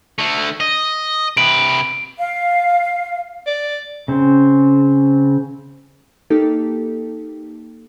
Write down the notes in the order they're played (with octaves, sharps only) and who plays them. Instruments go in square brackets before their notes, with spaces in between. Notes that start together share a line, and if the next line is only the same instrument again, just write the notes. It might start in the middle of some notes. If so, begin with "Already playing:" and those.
[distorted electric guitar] D3 A3
D#5
[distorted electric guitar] C3 B4 [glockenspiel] D7
[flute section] F5
[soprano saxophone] D5
[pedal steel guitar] C#3 C4
[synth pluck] A#3 D#4 G4 A4